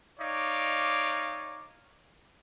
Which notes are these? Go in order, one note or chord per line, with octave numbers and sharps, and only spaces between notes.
D#4 C#5 D5 F5 D6